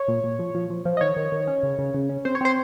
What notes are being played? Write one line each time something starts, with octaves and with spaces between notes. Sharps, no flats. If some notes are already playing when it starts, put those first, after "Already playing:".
Already playing: C#5
A#2
A#2
F3
F3
F3
F3
D#5
D#3 C#5
D#3
D#3
C#4
C#3
C#3
C#3
C#4
C4 C5
C#5
C4 C5